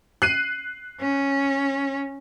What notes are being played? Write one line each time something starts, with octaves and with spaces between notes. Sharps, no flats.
F#6 C7 D#7
C#4